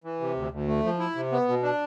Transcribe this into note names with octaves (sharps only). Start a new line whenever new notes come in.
E3
C3
D2
D2
A3
F3
E4
C3
B3
B2
D4